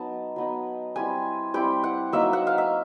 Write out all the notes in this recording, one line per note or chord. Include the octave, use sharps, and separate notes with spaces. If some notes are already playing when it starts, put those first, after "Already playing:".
Already playing: F#3 B3 D#4 A5
F#3 B3 D#4
G3 C4 E4 G#5
G3 C4 E4 G5
F#5
F#3 A#3 D#4 E5
F#5
F5
E5